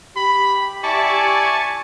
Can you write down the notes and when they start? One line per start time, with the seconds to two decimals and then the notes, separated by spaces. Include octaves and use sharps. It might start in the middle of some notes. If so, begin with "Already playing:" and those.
0.16 G4 B5
0.84 E4 D5 G#5 A5 C#6 D6